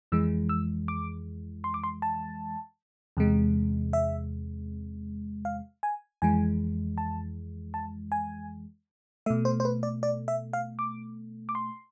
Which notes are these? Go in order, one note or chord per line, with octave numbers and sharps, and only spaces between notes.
F2 E3 G#3 E6
E6
D6
C6
D6
C6
A5
E2 C3 G#3
E5
F5
G#5
F2 E3 G#3 G#5
A5
A5
G#5
B2 A3 E5
C5
C5
B4
D5
D5
E5
F5
D6
D6
C6